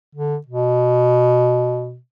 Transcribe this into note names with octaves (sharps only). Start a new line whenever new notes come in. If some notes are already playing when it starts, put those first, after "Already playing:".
D3
B2